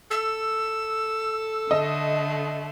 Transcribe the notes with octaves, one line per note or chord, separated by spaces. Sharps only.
A4 E6
D3 A3 D#5